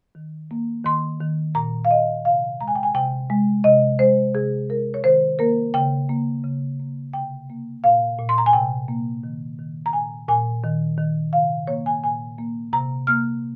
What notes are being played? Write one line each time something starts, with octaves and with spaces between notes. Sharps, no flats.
D#3
A#3
D#3 C6
D#3
A#2 A#5
F5
A#2 D#5
C3 F5
G#3 A#5
G#5
G5
G#5
C3 G5
G#3
C3 D#5
G#3 C5
C3 G#4
G#3 A#4
C#5
D#3 C5
A#3 A#4
C#3 G5
A#3
C#3
A#3
C3 G5
A#3
A#2 F5
A#2
C6
A#5
G#5
C3 G5
A#3
D#3
D#3
A#5
A#2 G#5
A#2 G#5
D#3
D#3
C3 F5
A#3 C#5
G#5
A#2 G#5
A#3
C3 A#5
A#3 F6